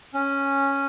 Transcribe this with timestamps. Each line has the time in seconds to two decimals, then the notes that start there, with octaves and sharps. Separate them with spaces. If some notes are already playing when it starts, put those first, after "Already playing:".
0.14 C#4